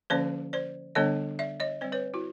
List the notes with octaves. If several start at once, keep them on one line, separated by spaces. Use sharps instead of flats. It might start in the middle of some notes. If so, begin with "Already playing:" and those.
D3 F3 A#3 C#4 C5 D5
C5 D5
D3 G3 B3 D4 C#5 D#5
D5 E5
C#5 D#5
G3 C4 C5 D5
B4 C#5
E4 F#4